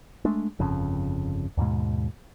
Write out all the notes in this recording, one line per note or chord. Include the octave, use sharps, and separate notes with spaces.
G#3 A3 D4
G1 F2 C#3
D#2 G#2 B2 G#3